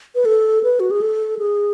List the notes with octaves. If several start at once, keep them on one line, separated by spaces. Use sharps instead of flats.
B4
A4
B4
F#4
G#4
A4
G#4